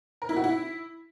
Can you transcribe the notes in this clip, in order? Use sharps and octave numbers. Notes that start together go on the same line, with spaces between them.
A#4
E4
F#4
E4